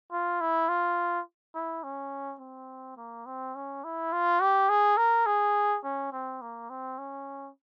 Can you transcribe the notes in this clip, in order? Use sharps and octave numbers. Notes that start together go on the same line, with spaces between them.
F4
E4
F4
E4
C#4
C4
A#3
C4
C#4
E4
F4
G4
G#4
A#4
G#4
C#4
C4
A#3
C4
C#4